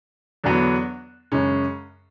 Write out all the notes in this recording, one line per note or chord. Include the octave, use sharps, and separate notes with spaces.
E2 D3 F#3 B3
F#2 C#3 G#3 C#4